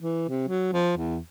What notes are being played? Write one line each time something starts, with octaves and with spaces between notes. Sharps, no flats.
E3
C3
F#3
F3
E2